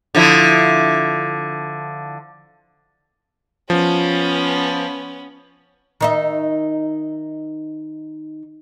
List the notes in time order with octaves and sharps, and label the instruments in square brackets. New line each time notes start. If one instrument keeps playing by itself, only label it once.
[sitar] D3 F3 E4
[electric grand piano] F3 [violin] B3 C#4
[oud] D#3 D#4 E5